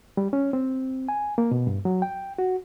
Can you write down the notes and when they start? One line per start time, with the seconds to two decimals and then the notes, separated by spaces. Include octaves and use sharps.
0.17 G3
0.33 C#4
0.53 C4
1.09 G#5
1.38 A#3
1.51 B2
1.67 G2
1.85 F#3
2.02 G5
2.38 F#4